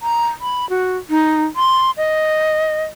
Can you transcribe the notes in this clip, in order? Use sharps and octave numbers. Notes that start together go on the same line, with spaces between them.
A#5
B5
F#4
D#4
C6
D#5